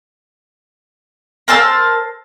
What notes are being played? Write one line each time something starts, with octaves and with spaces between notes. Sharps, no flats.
A#4 C5 A5 E6